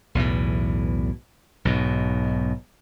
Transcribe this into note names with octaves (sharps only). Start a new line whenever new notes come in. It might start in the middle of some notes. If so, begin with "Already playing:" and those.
B1 E2 A2 E3
B1 G#2 B2